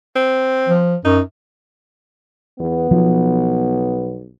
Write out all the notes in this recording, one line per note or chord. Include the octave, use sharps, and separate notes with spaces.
C4
F3
F#2 D#4
E2 B3
B1 F3